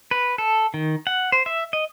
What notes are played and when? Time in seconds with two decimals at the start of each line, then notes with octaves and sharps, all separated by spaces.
0.11 B4
0.38 A4
0.74 D#3
1.07 F#5
1.32 C5
1.46 E5
1.73 D#5